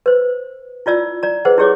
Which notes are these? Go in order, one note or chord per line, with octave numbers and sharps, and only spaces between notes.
B4 C5
E4 F4 D5 E6
D5 A#5
G#4 B4 C5 F#5
E4 G4 G#4 C#5 D6